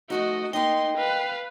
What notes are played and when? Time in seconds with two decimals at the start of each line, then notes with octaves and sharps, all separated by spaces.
0.10 F3 A3 D#4 F#4 D#5
0.53 A#3 D#4 D#5 G5 C6
0.97 B4 F5